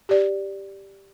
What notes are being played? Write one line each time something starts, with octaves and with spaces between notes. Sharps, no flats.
G4 D5